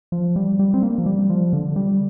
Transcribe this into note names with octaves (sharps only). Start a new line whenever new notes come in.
F3
G3
G3
C4
A#3
F3
G3
F3
D3
G3